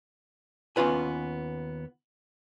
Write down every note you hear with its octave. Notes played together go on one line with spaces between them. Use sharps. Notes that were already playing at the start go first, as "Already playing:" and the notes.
D#2 B3 C#4 F4 B4 G#5